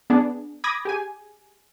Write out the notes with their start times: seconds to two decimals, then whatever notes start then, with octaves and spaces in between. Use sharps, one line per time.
0.10 B3 D4 G#4
0.64 B5 D6 D#6 G#6 A#6
0.85 G4 G#4 G#5